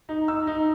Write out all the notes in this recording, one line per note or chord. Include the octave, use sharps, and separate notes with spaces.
D#4
D#4 E6
D#4